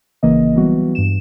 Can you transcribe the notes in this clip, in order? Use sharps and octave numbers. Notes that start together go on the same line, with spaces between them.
G#1 C#3 E3 A#3 D#5
E3 F#3 G3 B3 F#4
G2 E7